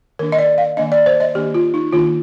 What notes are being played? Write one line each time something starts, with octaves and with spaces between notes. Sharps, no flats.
D#3 A#3 D4 A#4
D#5
D5
F5
D#3 A#3 D4 D#5
D5
C5
D#5
D#3 A#3 D4 G4
F4
D#4
D#3 A#3 D4 F4